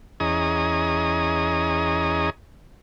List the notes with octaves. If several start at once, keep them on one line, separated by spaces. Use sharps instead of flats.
E2 C#4 G#4 D#5 A#5 D#6